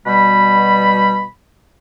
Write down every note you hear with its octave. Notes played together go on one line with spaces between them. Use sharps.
B2 G3 B5